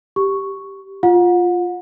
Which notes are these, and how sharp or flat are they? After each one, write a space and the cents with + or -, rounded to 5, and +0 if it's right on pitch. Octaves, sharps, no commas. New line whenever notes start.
G4 +0 C#6 +0
F4 +0 F#5 -35